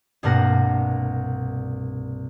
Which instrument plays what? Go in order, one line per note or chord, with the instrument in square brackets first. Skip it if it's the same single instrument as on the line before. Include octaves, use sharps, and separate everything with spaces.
[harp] C2 G2 B2 A#3 F#5 A#6